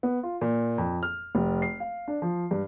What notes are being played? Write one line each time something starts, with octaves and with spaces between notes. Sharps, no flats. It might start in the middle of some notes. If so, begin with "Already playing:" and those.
B3
F4
A#2
F2
F6
F1
C7
F5
D4
F3
G2